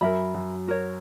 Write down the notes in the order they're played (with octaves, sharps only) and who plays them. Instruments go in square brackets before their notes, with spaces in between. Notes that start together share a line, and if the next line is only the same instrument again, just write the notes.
[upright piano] F#2 F#3 [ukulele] A#4 E5 B5
[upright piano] F#2 F#3
[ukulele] F#4 A#4 C#5